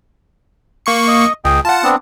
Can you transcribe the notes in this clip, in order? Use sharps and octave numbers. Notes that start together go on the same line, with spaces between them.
A#3 C#6 C#7
D#5
C#2 G#4 D#5 G5
F4 F#5 A5
B3 C4 D4